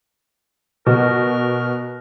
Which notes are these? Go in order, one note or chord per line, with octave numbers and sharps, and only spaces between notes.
B2 A#4